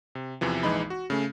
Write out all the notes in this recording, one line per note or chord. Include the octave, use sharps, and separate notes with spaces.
C3
E2 C3 E3 F3
A#1 E3 G#3 D#4 B5
F#4
C#3 A3 C#4